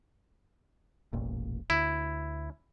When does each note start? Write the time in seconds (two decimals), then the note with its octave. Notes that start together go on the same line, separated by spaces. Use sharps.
1.13 E1 A1 A#2
1.70 D2 E4